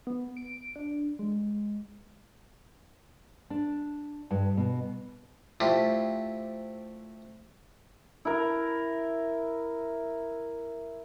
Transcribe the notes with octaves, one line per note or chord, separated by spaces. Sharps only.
B3
D7
D4
G#3
D4
G2
B2
A3 C4 D4 E4 F4 G4
E4 A#4